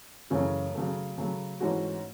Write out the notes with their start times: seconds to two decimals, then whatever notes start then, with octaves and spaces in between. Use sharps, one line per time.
0.30 F#2 C#3 E3 A3 C#4
0.74 C#3 F#3 A3
1.18 C#3 F#3 A3
1.60 G#2 E3 A3 C#4 F#4